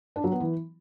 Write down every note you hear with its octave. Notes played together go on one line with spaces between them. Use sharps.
D4
F#3
B3
E3